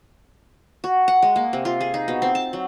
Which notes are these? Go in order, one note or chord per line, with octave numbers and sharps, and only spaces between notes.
F#4
F#5
G#3
A#3
C3
F4
G#4
D#4
B2
C4
A5
F#3